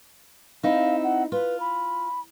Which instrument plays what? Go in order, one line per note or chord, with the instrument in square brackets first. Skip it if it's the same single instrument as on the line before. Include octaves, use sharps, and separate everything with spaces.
[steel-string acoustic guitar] C4 D#4 E4 [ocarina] F5
[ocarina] F#5
[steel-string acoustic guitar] F4 [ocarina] B4
[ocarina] B5